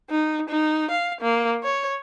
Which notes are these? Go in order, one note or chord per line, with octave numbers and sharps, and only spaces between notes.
D#4
D#4
F5
A#3
C#5